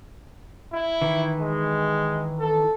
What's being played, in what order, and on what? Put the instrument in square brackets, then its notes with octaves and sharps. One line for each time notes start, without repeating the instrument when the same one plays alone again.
[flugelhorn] E4
[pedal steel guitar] D#3 E3
[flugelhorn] G#3
A4